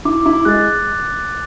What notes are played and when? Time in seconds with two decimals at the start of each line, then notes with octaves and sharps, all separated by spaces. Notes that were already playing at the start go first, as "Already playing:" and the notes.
0.05 E4 D6
0.26 E4
0.45 G#3 F#6 A6